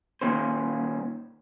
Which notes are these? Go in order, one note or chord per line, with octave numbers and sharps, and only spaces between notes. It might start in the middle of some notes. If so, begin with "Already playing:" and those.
A#2 D#3 C#4 C5